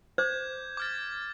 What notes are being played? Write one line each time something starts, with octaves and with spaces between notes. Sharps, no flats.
C5 D6 G6 G#6
D6 F6 A6